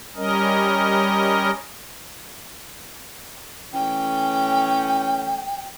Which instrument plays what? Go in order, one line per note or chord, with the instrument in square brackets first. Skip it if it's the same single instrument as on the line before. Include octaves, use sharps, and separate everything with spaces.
[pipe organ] G3 C#4 A#4 D#5
[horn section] E3 A3 C#4 [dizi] G5